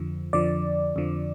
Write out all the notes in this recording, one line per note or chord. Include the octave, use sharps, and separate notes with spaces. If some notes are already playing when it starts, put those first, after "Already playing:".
Already playing: F2 D3 F3
F2 D3 F3 D5
F2 D3 F3